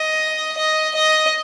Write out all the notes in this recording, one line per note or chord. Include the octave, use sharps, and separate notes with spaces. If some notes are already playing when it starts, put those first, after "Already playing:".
Already playing: D#5
D#5
D#5